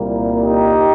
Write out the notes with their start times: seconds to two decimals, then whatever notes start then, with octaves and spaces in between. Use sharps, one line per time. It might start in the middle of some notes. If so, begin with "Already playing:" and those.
Already playing: C2 A#2 G3 A#3
0.41 D#4 G4